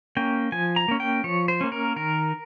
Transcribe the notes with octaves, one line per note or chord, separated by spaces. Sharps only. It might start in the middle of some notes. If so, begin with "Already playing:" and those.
A#3 C#4 G5
F3 G#5
A#5
A#3 C#4
G5
F3 C#5
C5
A#3 C#4
A#4
D#3 A#4